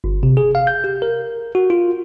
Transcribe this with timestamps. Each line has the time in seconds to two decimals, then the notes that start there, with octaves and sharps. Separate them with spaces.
0.04 G1
0.23 C3
0.37 G#4
0.55 F5
0.67 G6
0.84 G4
1.02 A#4
1.55 F#4
1.70 F4